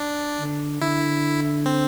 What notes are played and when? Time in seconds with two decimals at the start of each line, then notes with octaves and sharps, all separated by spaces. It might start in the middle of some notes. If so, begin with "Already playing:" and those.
Already playing: D4
0.40 D3
0.81 D3 E4
1.66 C4